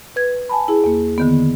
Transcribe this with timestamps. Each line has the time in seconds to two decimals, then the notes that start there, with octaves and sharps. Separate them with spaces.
0.16 B4 G#6
0.49 G#5 A5 B5
0.68 E4 G#4
0.84 E2 A#3
1.18 D3 D#3 B3